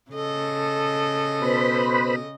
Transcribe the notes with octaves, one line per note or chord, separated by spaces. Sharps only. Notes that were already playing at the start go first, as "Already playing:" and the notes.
C#3 A4 D#5
B2 B4 C5 B5